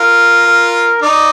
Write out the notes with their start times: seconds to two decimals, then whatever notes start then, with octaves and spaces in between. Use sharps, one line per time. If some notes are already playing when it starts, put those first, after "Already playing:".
Already playing: F4 A#4
0.47 A#4
1.02 D#4 D5